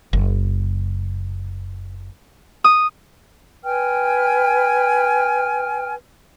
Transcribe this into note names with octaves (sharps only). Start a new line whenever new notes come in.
F#1
D#6
B4 G5 G#5 F6